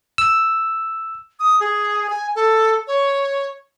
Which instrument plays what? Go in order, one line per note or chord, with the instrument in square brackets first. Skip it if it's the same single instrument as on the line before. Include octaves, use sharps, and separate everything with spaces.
[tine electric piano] E6
[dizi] D#6
G#4
G#5
A4
C#5